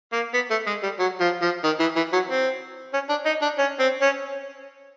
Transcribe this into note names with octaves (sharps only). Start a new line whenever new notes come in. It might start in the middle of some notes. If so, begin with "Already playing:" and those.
A#3
B3
A3
G#3
G3
F#3
F3
F3
D#3
E3
E3
F#3
C4
C#4
D4
D#4
D4
C#4
C4
C#4